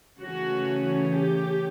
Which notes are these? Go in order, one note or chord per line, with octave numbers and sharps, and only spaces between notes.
C#3 E3 A3 C#4 F#4
G4